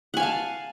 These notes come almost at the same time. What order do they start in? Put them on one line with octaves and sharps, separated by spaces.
F#5 G#5 F5 A5